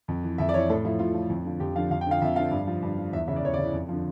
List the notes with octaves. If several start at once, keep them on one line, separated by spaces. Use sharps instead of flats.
F2
E3
F2 E5
D5
E3 C#5
A2 A4
F3 E4
A2 F4
F3
F2
D3 F3
F2 G4
D3 F3 F5
F2 F5
G5
D3 F3 F5
F2 E5
D3 F3 F5
G2
F3
G2
F3
E2 E5
C#3 E3 E5
D5
E2 C#5
C#3 D5
E3
F2
D3 F3